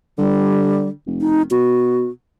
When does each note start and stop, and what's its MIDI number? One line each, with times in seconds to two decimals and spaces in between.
0.18 0.92 50
0.18 0.88 55
1.06 1.45 29
1.21 1.42 63
1.51 2.08 47
1.51 2.10 66